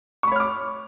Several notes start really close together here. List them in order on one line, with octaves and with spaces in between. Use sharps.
C#6 B5 C#5 F6 D6